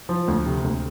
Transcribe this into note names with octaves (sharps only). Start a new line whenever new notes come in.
F3
D2
C3
D2